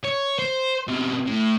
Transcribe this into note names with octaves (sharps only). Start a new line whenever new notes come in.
C#5
C5
B2 C4
A2